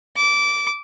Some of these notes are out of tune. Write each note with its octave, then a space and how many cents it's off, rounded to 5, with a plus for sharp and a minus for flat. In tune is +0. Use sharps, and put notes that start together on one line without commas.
D6 -15